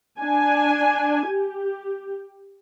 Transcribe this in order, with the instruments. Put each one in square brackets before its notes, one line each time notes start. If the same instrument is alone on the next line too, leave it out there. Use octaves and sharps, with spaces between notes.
[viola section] D4 G#5
G4